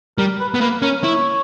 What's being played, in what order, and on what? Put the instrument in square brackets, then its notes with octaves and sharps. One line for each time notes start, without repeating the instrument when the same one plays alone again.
[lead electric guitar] G3 [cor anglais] A#4
[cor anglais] B4
[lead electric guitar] B3
[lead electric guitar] A#3 [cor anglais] B4
[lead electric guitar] C#4 [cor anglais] A#4
[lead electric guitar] E4 [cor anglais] C#5